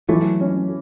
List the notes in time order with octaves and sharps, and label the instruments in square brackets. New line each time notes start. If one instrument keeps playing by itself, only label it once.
[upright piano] E3 [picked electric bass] F#3 A3
[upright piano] C#4